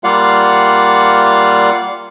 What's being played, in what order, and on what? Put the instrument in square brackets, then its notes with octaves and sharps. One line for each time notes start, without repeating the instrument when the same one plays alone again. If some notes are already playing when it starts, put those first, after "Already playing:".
[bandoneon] G3 A#3 F4 D5 F5 F#5